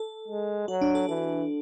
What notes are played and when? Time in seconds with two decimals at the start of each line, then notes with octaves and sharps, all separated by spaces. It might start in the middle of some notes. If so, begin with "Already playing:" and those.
Already playing: A4
0.28 G#3
0.68 F#3 F#4
0.81 D4
0.95 A4
1.09 E3 A4